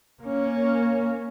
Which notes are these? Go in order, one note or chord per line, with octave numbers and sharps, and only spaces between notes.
A#3 C#4